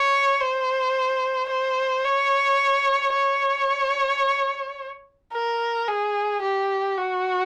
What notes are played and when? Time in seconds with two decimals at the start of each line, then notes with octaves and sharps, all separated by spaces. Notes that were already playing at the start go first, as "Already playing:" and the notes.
Already playing: C#5
0.41 C5
1.49 C5
2.05 C#5
3.14 C#5
5.33 A#4
5.88 G#4
6.42 G4
6.97 F#4